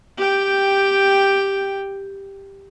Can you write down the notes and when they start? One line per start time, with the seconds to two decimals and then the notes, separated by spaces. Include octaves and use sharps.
0.18 G4 G5